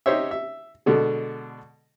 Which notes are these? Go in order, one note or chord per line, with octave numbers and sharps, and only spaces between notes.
D#4 G4 C5 C#5 E5
E5
B2 D3 G#3